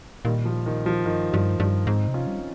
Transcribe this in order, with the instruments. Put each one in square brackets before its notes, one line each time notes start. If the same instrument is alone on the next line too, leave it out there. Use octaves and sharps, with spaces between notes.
[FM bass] A#2 [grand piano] D#3 G3
[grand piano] F3
D#3
F3
[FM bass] G2 [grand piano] D#3
[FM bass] G2 [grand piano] F3
[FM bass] G2 [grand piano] F3
[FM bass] G#2 [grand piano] C4 D#4
[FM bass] C3
[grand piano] C#4 F4
[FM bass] G3